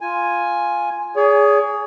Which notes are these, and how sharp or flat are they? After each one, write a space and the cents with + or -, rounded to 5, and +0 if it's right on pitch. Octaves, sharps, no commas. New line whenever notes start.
F4 +0 G#5 +0
G#4 +0 C#5 +45